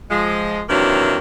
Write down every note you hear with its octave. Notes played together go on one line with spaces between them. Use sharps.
F3 G#3
C3 D#3 E3 F#3 A#3 D4